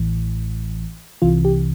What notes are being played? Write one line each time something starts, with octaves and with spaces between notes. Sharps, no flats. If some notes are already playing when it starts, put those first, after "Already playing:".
Already playing: A1 A2 E3
C2 C3 E3 F4
G4